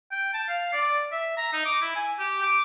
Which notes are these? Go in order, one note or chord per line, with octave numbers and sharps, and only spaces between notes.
G5
A5
F5
D5
E5
A#5
D#4
D6
E4
G#5
G4
D6